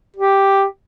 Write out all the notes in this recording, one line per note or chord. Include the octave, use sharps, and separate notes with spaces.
G4